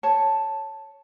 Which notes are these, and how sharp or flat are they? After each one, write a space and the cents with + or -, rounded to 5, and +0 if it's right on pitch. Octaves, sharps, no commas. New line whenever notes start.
C#5 +0 A5 +0